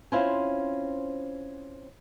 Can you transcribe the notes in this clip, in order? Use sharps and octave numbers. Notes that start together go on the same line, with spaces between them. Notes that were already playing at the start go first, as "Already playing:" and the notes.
C4 C#4 E4 F4 C5 G#5